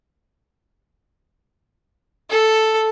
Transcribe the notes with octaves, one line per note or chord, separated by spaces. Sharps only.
A4